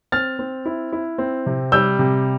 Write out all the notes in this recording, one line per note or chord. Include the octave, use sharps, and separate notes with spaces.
C4 F6 A6
C4
E4
E4
C4
C3
G3 E6 G6
C3